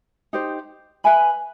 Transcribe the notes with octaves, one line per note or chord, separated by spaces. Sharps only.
D#4 G4 C5
B4 E5 G#5 B5